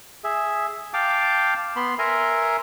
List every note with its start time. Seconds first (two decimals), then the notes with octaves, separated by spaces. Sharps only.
0.24 G#4 E5
0.94 F5 G5 A5 D6
1.76 B3 B5 C6
1.99 A#4 E5 G#5 A#5 C6